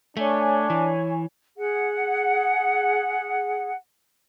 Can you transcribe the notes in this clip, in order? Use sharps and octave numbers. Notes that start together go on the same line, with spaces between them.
A3 D4 C#5 G#5
E3
G#4 F#5